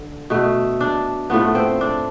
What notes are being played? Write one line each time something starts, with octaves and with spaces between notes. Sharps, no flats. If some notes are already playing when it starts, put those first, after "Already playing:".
Already playing: D3
B2 A3
D4
A2 F3 A3 B3
C4
D4